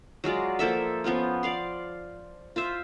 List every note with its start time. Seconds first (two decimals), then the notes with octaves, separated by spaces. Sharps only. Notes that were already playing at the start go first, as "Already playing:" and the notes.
0.24 F#3 G#3 F4 D5
0.59 F3 A#3 A4 E5
1.04 F3 B3 C#4 F4
1.43 D5 F5 C6
2.56 F4 C5 E5